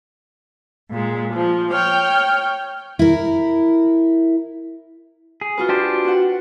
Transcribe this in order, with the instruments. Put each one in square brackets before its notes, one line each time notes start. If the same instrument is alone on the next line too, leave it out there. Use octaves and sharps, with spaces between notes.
[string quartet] A#2 G#3
F3
C#5 G5 F6
[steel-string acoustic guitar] E4 A#4
[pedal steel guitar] G#4
[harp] F4 F#4 B4
[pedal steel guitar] D4 G4 C5
[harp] F#4 F#5